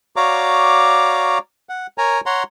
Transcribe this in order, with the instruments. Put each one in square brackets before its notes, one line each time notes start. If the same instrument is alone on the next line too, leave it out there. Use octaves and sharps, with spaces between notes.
[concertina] F#4 C#5 D5 F5 A#5 D6
F#5
A#4 C#5 G#5 A#5
C#5 F#5 A#5 C6